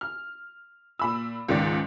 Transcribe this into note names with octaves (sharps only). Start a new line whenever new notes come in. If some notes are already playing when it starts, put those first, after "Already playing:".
F6
A#2 B5 E6
C#2 G#2 D#3 D5